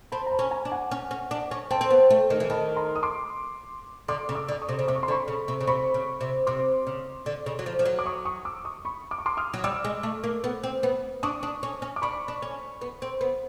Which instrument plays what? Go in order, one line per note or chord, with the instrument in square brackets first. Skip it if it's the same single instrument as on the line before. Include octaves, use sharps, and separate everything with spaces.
[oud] C4 [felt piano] A5 B5
[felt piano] A#5
A5 B5
[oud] C#4
[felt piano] G#5 A#5
[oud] D4
[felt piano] F#5 G#5
[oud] C#4
C#4
D4
C#4
[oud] C4 [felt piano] G5 A5
[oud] C4
B3
A3
D#3
E3
[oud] D#3 [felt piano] A5 B5
[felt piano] A#5 C6
D#6
C6 D6
[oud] D3 [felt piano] C6 D6
[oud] C#3
[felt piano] D6 E6
[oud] D3
[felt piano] D6
C#6 D#6
[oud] C3
C#3
[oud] C3 [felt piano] D6
[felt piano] C#6
C6
[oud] D3
[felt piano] B5 C#6
[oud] C#3
C3
C#3
[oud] C3 [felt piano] B5 C#6
[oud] C#3
C3
[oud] C3 [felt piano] C6 D6
[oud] C#3
D3
C#3
F#3
F3
F3
F#3
[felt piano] D6
C#6 D#6
C#6 D#6
D6 E6
C#6 D#6
B5 C#6
D6
C#6
C6 D6
D#6 F6
[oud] F#3
[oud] G3 [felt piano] D6 E6
[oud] G#3
A3
A#3
B3
C4
B3
[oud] D4 [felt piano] C#6 D#6
[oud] D4
C#4
C#4
[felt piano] D6
[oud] D4 [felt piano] B5 C#6
[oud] D4
C#4
B3
C4
B3